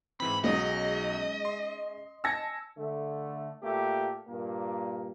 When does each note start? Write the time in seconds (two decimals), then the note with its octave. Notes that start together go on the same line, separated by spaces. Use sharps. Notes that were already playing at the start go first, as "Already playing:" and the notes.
0.20 G#2 E3 C4 B5
0.44 B1 F#3 G#3 C#4 D#4 D#5
1.45 C6
2.24 G#5 A5 E6 G#6 A#6 C#7
2.77 D3 A3
3.62 A#2 A3 A#3 G4
4.29 G2 A#2 A#3